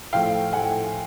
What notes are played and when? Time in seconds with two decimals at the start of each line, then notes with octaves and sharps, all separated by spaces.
0.13 A2 F3 A3 F5 G5
0.53 A2 F3 A3 F#5 G#5